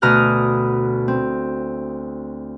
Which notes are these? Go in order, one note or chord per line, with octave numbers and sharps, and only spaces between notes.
D2 B2 A#5 D#6 F6 F#6
C4